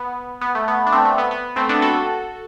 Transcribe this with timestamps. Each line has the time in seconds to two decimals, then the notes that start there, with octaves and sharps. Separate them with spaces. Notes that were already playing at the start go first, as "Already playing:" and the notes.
Already playing: B3
0.41 B3
0.55 A3
0.68 B3
0.86 D4
0.92 A3 C4
1.05 A3
1.18 B3
1.31 B3
1.56 A3 C4
1.69 B3 D4
1.82 F#4 A4